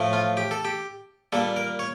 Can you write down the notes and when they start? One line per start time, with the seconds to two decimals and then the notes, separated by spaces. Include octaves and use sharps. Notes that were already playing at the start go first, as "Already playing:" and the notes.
Already playing: A2 F3 A3
0.13 F4
0.37 G4
0.51 A4
0.65 G4
1.32 A#2 G3 A#3 A4
1.56 A#4
1.79 C#5